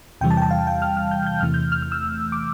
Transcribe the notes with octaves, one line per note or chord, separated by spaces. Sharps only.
E2 C3 E3 G3 G5
A5
G5
A5
F5
G5
F6
F6
G6
G6
E2 C3 E3 A3 F6
G6
F6
F6
E6
D6